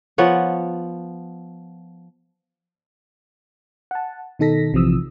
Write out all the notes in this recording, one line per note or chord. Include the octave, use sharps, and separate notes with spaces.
F3 B3 C#5 F#5
F#5 A5
B2 D#3 D#4 A4 A#6 B6
A#1 C3 E3 F3 D#6 E6